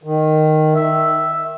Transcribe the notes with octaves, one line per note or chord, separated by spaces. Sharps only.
D#3
E5